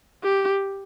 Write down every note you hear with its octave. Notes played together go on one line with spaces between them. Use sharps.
G4